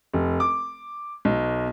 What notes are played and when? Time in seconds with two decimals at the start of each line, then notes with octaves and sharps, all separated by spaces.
0.13 F1
0.40 D6
1.25 B1